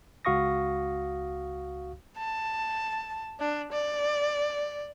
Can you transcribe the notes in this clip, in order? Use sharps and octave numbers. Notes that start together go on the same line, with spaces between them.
C#2 F#4 F5 C#6 D#6 A#6
A5
D4
D5